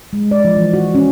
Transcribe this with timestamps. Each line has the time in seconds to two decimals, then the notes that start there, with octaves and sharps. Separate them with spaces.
0.13 G#3
0.31 D5
0.45 F3
0.57 E3
0.74 F#4
0.95 C#4